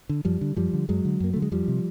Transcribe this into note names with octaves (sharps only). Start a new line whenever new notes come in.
D3
F#2 F3 G3
D3
F#2 F3 G3
D3
F#2 F#3 G#3
D3
F#2 A#3
D3 A3
G#3
F2 F3 G3
C3